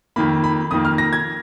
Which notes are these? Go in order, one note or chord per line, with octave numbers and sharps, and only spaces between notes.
F2 D#3 A#3 B5
B5
F2 D#3 A#3 D#6
F6
A#6
G#6